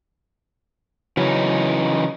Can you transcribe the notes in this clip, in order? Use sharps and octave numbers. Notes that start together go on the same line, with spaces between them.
C#3 E3 F#3 C#4 D#4